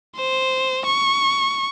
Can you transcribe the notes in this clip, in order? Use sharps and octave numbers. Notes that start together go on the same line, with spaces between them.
C5
C#6